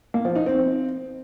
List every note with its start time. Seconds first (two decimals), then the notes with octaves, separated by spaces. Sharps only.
0.14 A#3
0.25 F3
0.36 D#4
0.46 C4